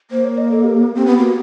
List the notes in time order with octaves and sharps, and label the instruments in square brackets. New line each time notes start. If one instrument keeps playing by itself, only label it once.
[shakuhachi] A#3 [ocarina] C5
[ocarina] C#5
D#5
A4
G4
[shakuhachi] C4
B3
[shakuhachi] A#3 [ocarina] F#4